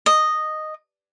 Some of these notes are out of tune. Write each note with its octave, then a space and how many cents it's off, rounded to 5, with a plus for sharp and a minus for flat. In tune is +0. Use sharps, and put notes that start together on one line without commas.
D#5 -5